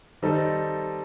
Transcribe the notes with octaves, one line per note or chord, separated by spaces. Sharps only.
D#3 G3 C4 D#4 A4